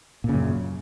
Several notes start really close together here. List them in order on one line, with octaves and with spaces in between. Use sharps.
A#2 C#3 F#2